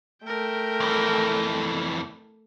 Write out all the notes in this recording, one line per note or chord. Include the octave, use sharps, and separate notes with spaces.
A3 A#4 G5
F2 E3